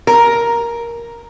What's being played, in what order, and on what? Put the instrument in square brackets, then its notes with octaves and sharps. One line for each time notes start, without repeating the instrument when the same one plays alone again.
[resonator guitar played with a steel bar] A#4